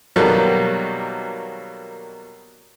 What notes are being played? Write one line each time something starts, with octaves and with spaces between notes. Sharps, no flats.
B2 D#3 F#3 G3 A#3 A4